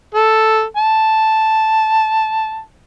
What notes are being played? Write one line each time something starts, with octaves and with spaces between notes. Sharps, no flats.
A4
A5